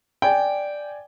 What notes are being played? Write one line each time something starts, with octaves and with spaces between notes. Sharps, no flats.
D5 G5 G#5